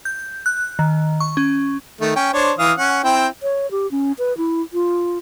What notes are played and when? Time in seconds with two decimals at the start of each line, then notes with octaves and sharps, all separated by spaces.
0.05 G6
0.46 F#6
0.79 D#3
1.20 C#6
1.37 C#4
2.01 D#3 A3
2.16 C#4 G5
2.33 D4 C5 C#5
2.59 E3 F5 D#6
2.78 C#4 F#5
3.04 C4 E4 G5
3.43 C#5
3.71 G4
3.91 C#4
4.19 B4
4.37 E4
4.73 F4